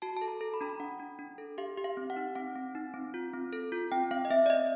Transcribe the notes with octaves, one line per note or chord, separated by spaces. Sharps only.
F#4 A5
A4 A5
A#5
A4
B5
D4 A#5
B5
D4 F#5
D4
D4
A4
G4 F5
G4
F5
C4
F#5
D#4
C4 F#5
C4
D#4
C4
F4
C4
A4
F4
C4 G5
C4 F5
D#5
C4 E5
D5
C4 D#5